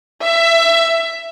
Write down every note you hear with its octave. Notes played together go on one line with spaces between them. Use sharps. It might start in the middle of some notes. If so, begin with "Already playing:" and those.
E5